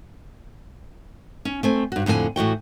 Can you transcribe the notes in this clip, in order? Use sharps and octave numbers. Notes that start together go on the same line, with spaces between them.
C#4
A3 C4 G#5
G2 F#4
F2 A2 D3 A4 G#5
A2 E3 F#4 G5